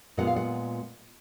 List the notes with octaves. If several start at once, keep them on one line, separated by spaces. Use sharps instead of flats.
A#2 G#3 B3 F4 F#5
F5
F#5